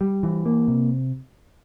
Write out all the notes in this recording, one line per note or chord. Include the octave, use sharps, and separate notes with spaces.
G3
E3
A#3
C3